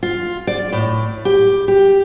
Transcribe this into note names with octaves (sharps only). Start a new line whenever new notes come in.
F4
D5
A2
G4
G4